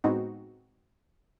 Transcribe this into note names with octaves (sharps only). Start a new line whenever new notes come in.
A2 G#3 B3 C4 D#4 F#4